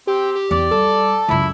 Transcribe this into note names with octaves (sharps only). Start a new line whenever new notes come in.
C4 G4
G4
E2 D5
G3 A4
C#2 F#2 E4